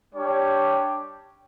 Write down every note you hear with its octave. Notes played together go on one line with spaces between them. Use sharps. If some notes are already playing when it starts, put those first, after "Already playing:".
G3 D4 G4 C#5 G5